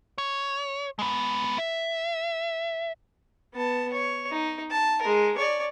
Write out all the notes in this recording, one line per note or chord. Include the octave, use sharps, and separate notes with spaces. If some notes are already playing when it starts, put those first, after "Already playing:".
C#5
G#3 B3
E5
B3 A5
C#5
D#4
A5
G#3 A#4
C#5 D5